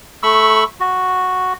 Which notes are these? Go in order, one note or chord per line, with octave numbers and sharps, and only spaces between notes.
A3 B5 C#6 E6
F#4